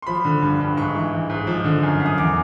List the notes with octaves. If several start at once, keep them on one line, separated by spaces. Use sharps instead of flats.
C6
F3 B5
D3
G2
G2
G#2 C#6
E3
E3
G#2
F3
D3
F#2
F#2
D#6
E2 D6